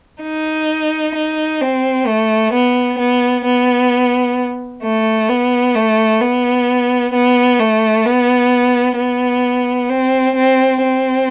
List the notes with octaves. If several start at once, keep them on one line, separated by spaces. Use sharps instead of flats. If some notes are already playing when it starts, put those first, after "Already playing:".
D#4
D#4
C4
A3
B3
B3
B3
A3
B3
A3
B3
B3
A3
B3
B3
C4
C4
C4